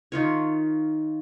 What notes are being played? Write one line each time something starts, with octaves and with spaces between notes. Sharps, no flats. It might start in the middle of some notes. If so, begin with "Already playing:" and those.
D#3 F4 C#5